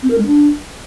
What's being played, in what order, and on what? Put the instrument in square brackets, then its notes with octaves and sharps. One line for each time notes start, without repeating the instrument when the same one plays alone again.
[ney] C4
A#4
G#3
D4